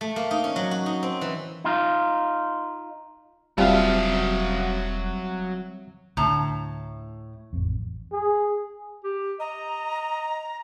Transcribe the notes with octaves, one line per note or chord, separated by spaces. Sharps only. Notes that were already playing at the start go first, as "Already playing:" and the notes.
A3
A#3
D#4
C#4
F#3
F#4
D#4
C4
E3
D#4 F4
E1 F#3 G3 C4 F4 E5 F5 A5
D2 A2 D3 A5 A#5
A1 F2
G#4
G4
D#5 A#5